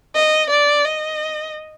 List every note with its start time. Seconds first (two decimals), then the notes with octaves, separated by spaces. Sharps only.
0.15 D#5
0.50 D5
0.85 D#5